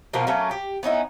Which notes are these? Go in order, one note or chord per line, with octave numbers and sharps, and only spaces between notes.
B2 F3 A#3 B3
F#3 A3 A#3 C#4
G4
B3 C#4 D#4 E4